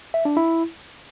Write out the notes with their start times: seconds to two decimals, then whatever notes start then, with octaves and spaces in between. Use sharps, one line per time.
0.14 E5
0.25 D4
0.37 E4